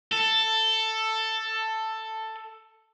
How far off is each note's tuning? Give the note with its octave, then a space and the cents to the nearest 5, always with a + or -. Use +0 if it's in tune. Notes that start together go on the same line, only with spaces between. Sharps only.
A4 +10